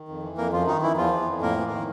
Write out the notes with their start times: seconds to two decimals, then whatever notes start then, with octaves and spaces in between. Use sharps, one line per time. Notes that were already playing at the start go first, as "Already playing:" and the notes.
Already playing: D#3
0.08 F2
0.23 E3
0.38 F2 A#3 A#4
0.53 F#2 F3 F4
0.67 D#3 D#4
0.82 E3 E4
0.97 E2 F3 F4
1.12 E3
1.27 F2
1.41 A2 A#3 A#4
1.57 E3
1.71 D#3